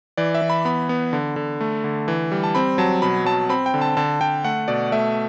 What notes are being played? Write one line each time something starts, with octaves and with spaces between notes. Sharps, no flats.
E3 D5
E5
E3
B5
B3 B5
B3
D3
D3
A3
D3
E3
G3
A5
C4 B5
F#3 A5
B2 B5
F#3 A5
C4 B5
G5
D3
A5
D3 A5
D3 G5
A3 F#5
B2 D5
A3 E5